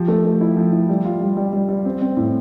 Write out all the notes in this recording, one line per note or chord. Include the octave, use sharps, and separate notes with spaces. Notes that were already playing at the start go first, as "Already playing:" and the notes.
Already playing: F3 G4
A3
A3
E4
F3
E4
G3
F4
G3
G3
G3
G3
C4
C4
A2